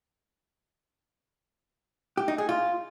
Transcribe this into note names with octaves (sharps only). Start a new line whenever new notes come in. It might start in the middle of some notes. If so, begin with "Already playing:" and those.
G4
D#4
G#4
F4